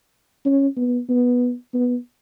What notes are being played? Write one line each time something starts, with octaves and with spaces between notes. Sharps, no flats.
C#4
B3
B3
B3